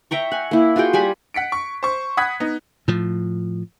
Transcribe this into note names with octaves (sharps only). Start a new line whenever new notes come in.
E5 G5 A#5 C#6
F#5 G#5
A#3 E4
F4 F#4 G#4 G5
G3 G4 G#5 B5
F#5 B6 C#7 D7
C#6
C5 C#6
F#5 B5 D#6 F#6 G#6 B6
B3 D#4
A2 F3